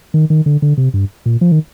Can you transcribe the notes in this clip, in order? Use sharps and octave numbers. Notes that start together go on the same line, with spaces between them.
D#3
D#3
D3
D3
C3
G2
A#2
F3
D#3